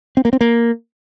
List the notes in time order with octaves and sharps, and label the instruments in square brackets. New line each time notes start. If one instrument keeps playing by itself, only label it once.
[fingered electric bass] C4
A#3
C4
A#3